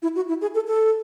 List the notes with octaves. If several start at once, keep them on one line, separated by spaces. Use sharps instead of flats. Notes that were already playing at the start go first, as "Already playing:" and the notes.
E4
F#4
E4
G#4
A4
A4